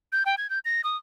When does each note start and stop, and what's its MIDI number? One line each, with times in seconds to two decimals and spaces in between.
0.12 0.23 91
0.26 0.35 79
0.38 0.49 92
0.50 0.59 91
0.65 0.81 94
0.84 0.97 87